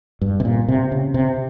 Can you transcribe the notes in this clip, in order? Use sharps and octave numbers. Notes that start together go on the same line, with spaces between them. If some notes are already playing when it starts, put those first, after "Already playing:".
G2
C3
A#2
C3
C#3
C3